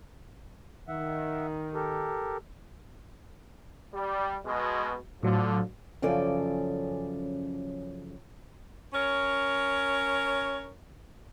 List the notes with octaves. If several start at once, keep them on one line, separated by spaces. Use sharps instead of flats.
D#3 E5 F#5
G4 A4 A#4
G3
B2 G#3
A2 D3 F3 F#3
F#2 C#3 F3 A4 D5 G#5
C#4 A#4 C#5